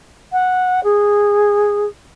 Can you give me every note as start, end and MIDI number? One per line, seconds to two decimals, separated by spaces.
0.32 0.80 78
0.84 1.85 68